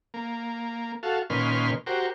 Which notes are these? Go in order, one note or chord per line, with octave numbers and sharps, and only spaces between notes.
A#3
F#4 A4 F5
A#2 D#3 C#4 B4 C6 F6
F#4 G4 A#4 C5